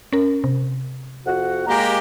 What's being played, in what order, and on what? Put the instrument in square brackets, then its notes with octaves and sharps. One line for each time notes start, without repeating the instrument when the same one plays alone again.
[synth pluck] C#4 A#4
C3
[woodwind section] F2 F#4 F#5
[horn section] G#3 A#3 G4 [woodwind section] A#5